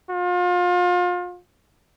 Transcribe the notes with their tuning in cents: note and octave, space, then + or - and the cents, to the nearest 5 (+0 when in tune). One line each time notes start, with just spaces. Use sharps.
F4 +35